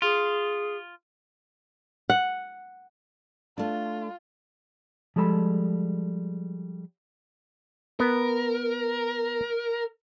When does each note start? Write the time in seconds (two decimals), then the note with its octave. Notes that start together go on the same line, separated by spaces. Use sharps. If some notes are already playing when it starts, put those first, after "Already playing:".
0.02 F4 G#4
2.10 F#5
3.58 A3 D4 F4
5.16 F3 G3 G#3 A4 A#5 B5
8.00 B3 A#4